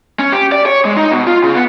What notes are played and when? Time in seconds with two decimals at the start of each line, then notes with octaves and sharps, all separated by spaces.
0.19 C#4
0.32 G4
0.52 D5
0.66 C#5
0.85 G#3
0.97 D#4
1.11 B2
1.27 F4
1.43 C#3
1.55 B3